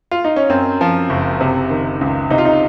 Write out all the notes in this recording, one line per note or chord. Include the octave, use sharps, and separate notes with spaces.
F4
D#4
C#4
F#2 C4
F3
F#1
C3
D#3
C#2
C3 D#4
F4
D#4